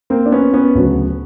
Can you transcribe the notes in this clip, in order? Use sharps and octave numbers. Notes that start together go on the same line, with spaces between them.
A#3 C4
D4
B3 C#4
B3 C#4
D2 C#3 F#3